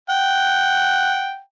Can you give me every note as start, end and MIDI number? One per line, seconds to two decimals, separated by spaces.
0.09 1.39 78
0.09 1.39 79